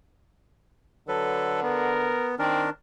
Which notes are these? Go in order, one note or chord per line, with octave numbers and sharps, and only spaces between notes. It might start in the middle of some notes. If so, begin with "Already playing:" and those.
D3 F#3 A4 B4
B3 A#4
D#3 C4 D4 A#4